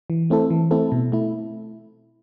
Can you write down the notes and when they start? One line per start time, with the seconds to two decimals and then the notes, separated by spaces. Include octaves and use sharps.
0.10 E3
0.30 A3 C4 E4 A4
0.51 E3
0.71 A3 C4 E4 A4
0.92 B2
1.12 A3 E4